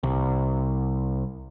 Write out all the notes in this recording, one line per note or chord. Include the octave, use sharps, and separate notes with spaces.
C2